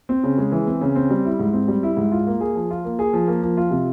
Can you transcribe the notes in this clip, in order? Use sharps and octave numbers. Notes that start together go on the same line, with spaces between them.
C4
C#3
G#3
E3
C4
C#3
C4
G3
E4
G#2
C4
G3
E4
G#2
F4
A#3
G#4
F3
F4
A#3
G#4
F3
A#3
F3
F4
C3